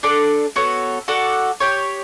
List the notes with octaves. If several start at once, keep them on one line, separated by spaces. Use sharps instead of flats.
D4 A4 D5
B3 F#4 A4 C#5
F#4 A4 D5 F#5
G4 C#5 G5